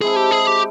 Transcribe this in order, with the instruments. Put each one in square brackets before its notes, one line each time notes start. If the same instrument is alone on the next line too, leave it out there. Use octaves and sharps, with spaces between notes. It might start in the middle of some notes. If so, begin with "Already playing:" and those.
[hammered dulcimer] G#3 C4 E4 A4 [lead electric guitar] G#4
[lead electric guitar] G4
G#4
G4